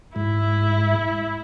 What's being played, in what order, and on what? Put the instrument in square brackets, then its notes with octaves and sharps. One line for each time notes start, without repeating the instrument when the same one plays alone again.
[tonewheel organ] G#2 [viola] E4